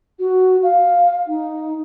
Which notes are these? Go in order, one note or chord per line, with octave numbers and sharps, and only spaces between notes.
F#4
F5
D#4